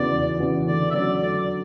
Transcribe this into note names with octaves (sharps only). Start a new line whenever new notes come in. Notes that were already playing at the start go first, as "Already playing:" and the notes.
Already playing: E2 C#3 E3 B3 F#4 D5
E2
C#3 E3 B3 F#4
D3 D5
E5
F#3 C#4 F#4 D5
D3 D5